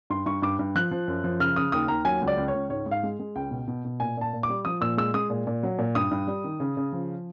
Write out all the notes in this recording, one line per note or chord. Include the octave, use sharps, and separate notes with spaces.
G2 C6
G2 C#6
G2 D6
G2
F3 F#6
F3
F#2
F3
C#3 F6
C#3 D#6
D#2 D#6
D#2 A#5
F#3 G#5
C#2
D5
C#2
C#5
C#2
G#2 C#5
G#2
F5
G#3
G#3
C#2 G5
B2
B2
B2
A#2 G#5
A#2 A5
A#2
D6
G3
F3 D#6
A#2 E6
G#3 E6
G#3 D#6
A#2
A#2
F#3
A#2
G2 D#6
G2
G3
D#3
C#3
C#3
F3